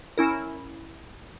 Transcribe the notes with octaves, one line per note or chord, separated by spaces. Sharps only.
C#4 E4 A#4